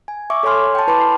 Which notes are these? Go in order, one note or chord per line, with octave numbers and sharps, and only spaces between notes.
G#5
E5 C#6 D6
A4 C#5 E5 G#5 C6 F6
G5 A5
E4 B4 A5 B5 C6 D6
C7